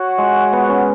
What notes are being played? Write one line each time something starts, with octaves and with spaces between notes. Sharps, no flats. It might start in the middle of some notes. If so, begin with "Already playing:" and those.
Already playing: F#4 C#5 F#5
G#3
B3
C#4